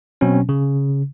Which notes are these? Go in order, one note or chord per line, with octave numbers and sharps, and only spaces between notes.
B2 F#3 C4 C#4
C#3